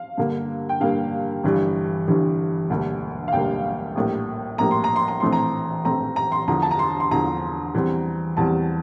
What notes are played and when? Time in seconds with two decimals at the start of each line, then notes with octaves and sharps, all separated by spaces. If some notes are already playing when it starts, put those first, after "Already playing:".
Already playing: F5
0.17 G2 D3 G3 A#3
0.69 G5
0.80 G2 D3 G3 A#3 F5
1.43 G1 G2 E3 G3
2.07 G1 G2 E3 G3
2.69 E1 D2 D3 G3 A#3
3.28 F5
3.32 E1 D2 D3 G3 A#3 G5
3.95 A#1 A2 G3 A#3
4.58 A#1 A2 G3 A#3 A#5
4.71 C6
4.84 A#5
4.96 C6
5.08 A#5
5.20 A#1 A2 E3 A3 C4 C6
5.32 A#5
5.85 A#1 A2 E3 A3 C4 A#5
6.16 A#5
6.32 C6
6.48 E2 D3 F3 A#5
6.62 A5
6.71 A#5
6.79 C6
7.00 C6
7.11 E2 D3 F3 A#5
7.74 E2 E3 G3 C4
8.37 E2 E3 G3 C4 A5